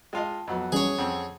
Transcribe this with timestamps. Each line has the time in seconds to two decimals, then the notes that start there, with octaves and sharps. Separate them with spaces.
0.13 G#3 F4 D#5 G5 A5
0.47 F2 F#3 B3 D#5 F#5
0.72 E3 G3 C#4 G#4 C#5
0.98 F2 C4 F#5